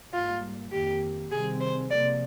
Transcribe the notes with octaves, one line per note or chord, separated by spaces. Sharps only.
G#2 G3 A#3 F4
F2 D#3 A#3 G4
C3 D#3 G3 C4 G#4
C5
C3 F3 A#3 D5